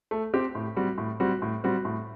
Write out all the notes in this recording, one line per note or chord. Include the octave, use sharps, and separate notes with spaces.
A3
C4 G4
A2
G3 C4 F#4
A2
G3 C4 F#4
A2
G3 C4 F#4
A2